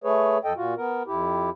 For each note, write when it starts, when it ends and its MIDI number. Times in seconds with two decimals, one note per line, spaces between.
0.04 0.38 57
0.04 0.38 68
0.04 0.38 71
0.04 0.38 73
0.44 0.53 41
0.44 0.53 69
0.44 0.53 75
0.44 0.53 79
0.56 0.74 46
0.56 0.74 65
0.56 0.74 66
0.77 1.03 59
0.77 1.03 70
1.07 1.50 41
1.07 1.50 64
1.07 1.50 67